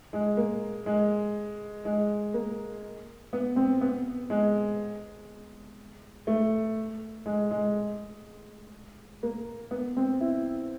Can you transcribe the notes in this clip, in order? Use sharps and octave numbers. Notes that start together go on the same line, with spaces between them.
G#3
A#3
G#3
G#3
A#3
B3
C4
B3
G#3
A3
G#3
G#3
A#3
B3
C4
E4